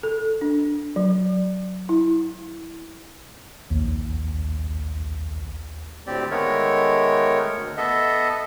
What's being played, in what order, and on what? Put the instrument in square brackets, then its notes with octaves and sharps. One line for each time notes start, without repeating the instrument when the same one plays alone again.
[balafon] A4
D4
F#3
E4
[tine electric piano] A#1 D#2
[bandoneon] D2 A2 C4 G4 D5
D#3 G#3 A3 B3 A#4 C#5
D2
B3 A4 D#5 E5